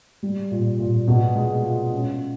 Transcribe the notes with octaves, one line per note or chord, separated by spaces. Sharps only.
G3
A#2
A#2
B2
G#3
F4
C#4